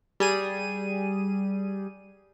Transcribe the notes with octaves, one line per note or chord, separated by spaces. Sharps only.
G3 G#4 D#7